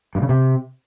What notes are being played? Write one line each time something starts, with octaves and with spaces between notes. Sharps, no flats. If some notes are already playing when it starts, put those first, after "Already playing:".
G2
C#3
C3